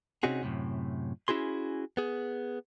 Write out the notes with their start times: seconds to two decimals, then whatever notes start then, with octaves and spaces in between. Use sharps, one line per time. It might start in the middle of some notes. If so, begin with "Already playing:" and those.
0.23 C3 C4 C#4 D#4 F#4 G#4
0.43 F#2 A2 C3
1.28 C#4 E4 F#4 G#4 C6
1.97 B3 G#4